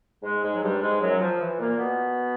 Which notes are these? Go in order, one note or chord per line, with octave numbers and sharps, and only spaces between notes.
G#2 G#3
G#2 G#3
F#3
G2 G3
G#2 G#3
F#2 F#3
F3
E3
A#2 A#3
B2 B3